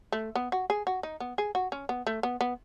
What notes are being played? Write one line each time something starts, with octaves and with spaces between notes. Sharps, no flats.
A3
B3
F#4
G#4
F#4
D#4
B3
G#4
F#4
C#4
B3
A3
B3
B3